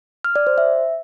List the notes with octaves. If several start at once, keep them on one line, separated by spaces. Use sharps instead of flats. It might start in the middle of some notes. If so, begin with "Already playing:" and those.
F6
D5
C5
E5